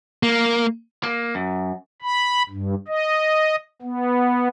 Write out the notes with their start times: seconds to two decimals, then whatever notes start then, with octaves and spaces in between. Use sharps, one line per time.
0.23 A#3
1.03 A#3
1.35 F#2
2.02 B5
2.49 G2
2.88 D#5
3.82 B3